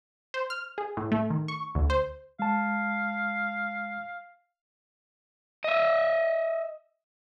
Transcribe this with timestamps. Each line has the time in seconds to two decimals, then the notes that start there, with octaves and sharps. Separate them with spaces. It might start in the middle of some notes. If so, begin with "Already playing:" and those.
0.34 C5
0.50 F6
0.78 G#4
0.97 A2
1.12 A3
1.30 D#3
1.48 C#6
1.75 D2
1.90 C5
2.39 G#3 F5 A5
5.64 D#5 E5